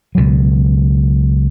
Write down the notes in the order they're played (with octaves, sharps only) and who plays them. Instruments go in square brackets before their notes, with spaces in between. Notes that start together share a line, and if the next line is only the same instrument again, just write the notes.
[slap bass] C#2 B2 F#3